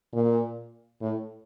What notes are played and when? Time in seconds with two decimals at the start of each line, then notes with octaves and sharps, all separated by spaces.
0.13 A#2
1.01 A2